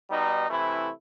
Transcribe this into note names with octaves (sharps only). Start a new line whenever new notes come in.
B2 G3 D#4
C3 E3 A3 E4